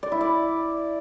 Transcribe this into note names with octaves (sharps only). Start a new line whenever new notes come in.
D5
E4
D5